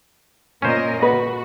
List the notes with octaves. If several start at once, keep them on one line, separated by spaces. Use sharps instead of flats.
A#2 C#4 A#4 C5 D#5
F#4 B4